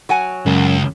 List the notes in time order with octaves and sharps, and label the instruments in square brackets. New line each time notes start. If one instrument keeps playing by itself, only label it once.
[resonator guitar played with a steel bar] F#3 F#5 G#5
[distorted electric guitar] C#2 [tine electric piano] F#2